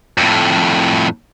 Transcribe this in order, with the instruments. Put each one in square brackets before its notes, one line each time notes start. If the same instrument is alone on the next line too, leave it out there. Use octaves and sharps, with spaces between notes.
[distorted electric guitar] F2 A2